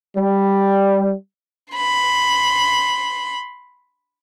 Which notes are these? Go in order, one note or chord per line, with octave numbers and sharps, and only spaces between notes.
G3
B5 C6